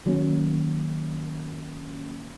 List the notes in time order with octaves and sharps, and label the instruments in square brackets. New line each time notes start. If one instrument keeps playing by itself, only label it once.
[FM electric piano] D#3 F#3 A#3 C#4